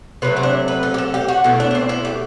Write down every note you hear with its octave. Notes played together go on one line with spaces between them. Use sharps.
C3 F#3 A3 B4
C4
D4
B4
A4
G4
A4
G4
F#4
B2 A3 E4
D4
D4
C4
E4
G4